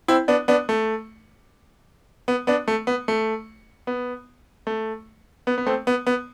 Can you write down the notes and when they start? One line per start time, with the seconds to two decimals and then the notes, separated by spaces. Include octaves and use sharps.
0.08 C4 E4
0.28 B3 D4
0.48 B3 D4
0.69 A3
2.28 B3
2.47 B3 D4
2.68 A3
2.87 B3
3.08 A3
3.87 B3
4.67 A3
5.47 B3
5.58 B3
5.66 A3 C4
5.87 B3
6.07 B3